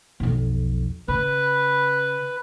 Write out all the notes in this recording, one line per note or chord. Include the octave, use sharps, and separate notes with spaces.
B1 F2
C#3 B4